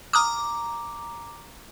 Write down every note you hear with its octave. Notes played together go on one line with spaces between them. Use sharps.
A#5 D6 D#6 F6